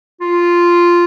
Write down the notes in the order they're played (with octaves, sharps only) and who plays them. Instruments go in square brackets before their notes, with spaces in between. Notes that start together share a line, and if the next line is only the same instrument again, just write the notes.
[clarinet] F4